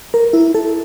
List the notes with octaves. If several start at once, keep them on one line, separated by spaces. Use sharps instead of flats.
A#4
E4
A4